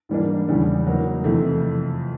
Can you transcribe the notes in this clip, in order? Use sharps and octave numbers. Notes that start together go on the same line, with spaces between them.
G#2 E3 G3 A#3 D4
E2 C#3 E3 G3
F#3 A#3 D#4
F2 C3 E3 A3